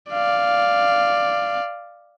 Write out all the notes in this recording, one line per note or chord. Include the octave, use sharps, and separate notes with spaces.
D5 F5